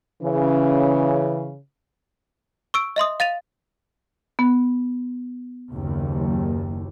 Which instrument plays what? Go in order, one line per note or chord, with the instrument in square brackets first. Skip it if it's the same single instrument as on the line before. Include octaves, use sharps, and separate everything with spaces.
[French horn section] C#3 [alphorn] E3
[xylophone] C#6 E6 D7
D#5 E5 C6 D#6
F5 A6 D#7 F7
[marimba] B3
[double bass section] F#1 D#2